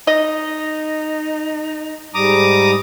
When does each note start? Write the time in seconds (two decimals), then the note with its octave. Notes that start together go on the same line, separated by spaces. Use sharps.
0.07 D#4 D#5
2.15 G#2 G3 A#5 D6 D#6